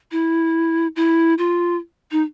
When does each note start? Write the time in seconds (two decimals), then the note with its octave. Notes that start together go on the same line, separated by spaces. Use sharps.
0.11 E4
0.96 E4
1.38 F4
2.12 D#4